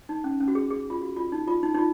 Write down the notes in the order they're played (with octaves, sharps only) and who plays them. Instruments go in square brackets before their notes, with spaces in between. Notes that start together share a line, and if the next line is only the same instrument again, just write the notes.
[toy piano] D#4
C#4
C#4
F#4
G#4
G#4
F4
F#4
F4
D#4
F4
D#4
D#4
F4